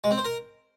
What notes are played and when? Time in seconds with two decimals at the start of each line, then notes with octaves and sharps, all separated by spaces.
0.04 G#3
0.11 C4
0.18 C5
0.25 A#4